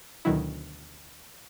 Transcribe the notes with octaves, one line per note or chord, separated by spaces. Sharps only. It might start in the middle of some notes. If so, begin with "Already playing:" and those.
D2 B2 D#3 F#3 E4